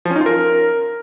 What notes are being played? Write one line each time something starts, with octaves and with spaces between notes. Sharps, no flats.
F3
C#4
D#4
F4
A#4